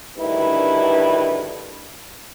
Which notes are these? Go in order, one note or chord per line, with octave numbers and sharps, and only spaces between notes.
D2 G2 D#3 E4 B4